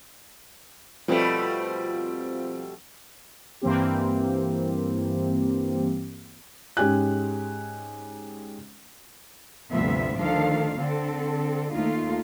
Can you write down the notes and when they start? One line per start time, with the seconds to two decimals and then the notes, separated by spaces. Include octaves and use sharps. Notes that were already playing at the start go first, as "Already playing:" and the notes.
1.08 B2 F3 G3 A3 C4
3.62 G2 E3 A#3 C4 G4
6.77 G#2 G#3 C#4 G4 G#5 F#6
9.72 D2 G2 C3 F3 B3 E5
10.17 D2 D#3 F3 D4 A4 F5
10.78 D3 C4 A4
11.71 D#2 A3 D#4 F4